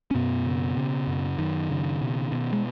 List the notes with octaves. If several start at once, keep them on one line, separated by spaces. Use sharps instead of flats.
C#4
F#2 B2 B3
C#3
C#3
F#2
F#2 D#3
C#3
B2
B2
G#3